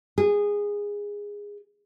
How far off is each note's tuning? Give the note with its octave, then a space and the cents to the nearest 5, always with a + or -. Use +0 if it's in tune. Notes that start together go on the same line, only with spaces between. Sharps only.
G#4 -15